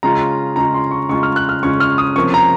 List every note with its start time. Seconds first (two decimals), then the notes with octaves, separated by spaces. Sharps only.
0.03 C#3 G#3 C#4 F4 A#5
0.56 C#3 G#3 C#4 F4 A#5
0.74 C6
0.91 C#6
1.09 C#3 G#3 C#4 F4 C#6
1.23 F6
1.36 F#6
1.49 F6
1.63 C#3 G#3 C#4 F4 C#6
1.80 F6
1.98 D#6
2.16 C3 F3 A#3 C#4 C#6
2.34 A#5